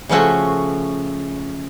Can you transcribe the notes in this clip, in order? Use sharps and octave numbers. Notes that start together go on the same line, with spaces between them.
C#3 F3 A3 C#4 F#4